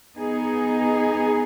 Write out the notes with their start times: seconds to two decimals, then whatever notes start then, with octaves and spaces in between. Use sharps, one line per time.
0.16 B3 D#4 G#4